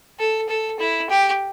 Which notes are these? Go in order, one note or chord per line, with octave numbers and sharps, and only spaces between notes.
A4
A4
E4
G4